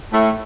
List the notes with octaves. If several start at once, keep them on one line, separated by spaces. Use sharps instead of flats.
A2 A3